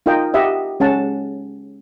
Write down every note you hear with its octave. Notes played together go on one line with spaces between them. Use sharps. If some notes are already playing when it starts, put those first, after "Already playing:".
D#4 F4 A#4 D#5 G5
G4 D#5 E5 F#5
G#3 C#4 F#5 A5